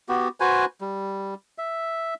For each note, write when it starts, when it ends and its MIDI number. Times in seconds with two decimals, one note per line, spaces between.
0.09 0.28 59
0.09 0.28 66
0.09 0.28 67
0.40 0.65 66
0.40 0.65 71
0.40 0.65 72
0.40 0.65 80
0.81 1.34 55
1.58 2.14 76